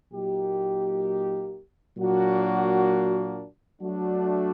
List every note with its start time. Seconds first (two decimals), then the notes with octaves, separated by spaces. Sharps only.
0.12 A#2 F#3 A#3 D#4 G4
1.98 A#2 F#3 A#3 D4 F#4
3.82 F#3 A3 D4 F#4